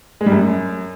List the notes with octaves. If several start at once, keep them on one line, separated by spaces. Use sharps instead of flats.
G#3
G3
F#2